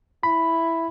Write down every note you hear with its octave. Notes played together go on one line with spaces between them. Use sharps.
E4 B5